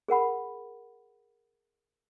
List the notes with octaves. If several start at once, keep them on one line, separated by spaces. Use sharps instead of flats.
G#4 A#4 F#5 B5